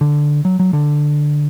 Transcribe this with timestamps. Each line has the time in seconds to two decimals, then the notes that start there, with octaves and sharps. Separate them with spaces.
0.01 D3
0.45 F#3
0.60 F#3
0.73 D3